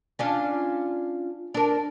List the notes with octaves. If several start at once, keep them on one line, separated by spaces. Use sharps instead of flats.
C#4 D4 F4
D4 A#4